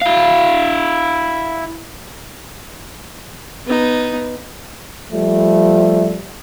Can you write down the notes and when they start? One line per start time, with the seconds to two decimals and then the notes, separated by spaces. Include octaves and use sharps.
0.01 E4 F5
3.66 B3 D#4
5.12 F3 G3 A3